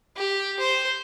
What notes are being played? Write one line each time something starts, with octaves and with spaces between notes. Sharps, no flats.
G4
C5